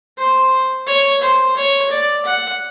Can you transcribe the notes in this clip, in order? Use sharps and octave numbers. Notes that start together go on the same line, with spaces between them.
C5
C#5
C5
C#5
D5
F#5